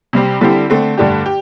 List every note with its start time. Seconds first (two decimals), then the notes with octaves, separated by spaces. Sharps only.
0.13 C3 G3 C4 G4
0.41 D3 G3 C4 E4 G4
0.70 D3 A3 C4
0.98 G2 D3 A3 D4 G4
1.26 G4